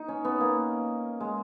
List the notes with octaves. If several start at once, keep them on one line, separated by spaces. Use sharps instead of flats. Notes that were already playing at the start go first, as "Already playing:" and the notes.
Already playing: D#4
C#4
B3
A#3
G#3